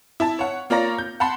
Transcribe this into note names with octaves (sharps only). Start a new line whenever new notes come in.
E4 E5 A5
C#5 F#5
A#3 F4 C#5 D5 A#5 A#6
G6
F#5 A5 B5 C6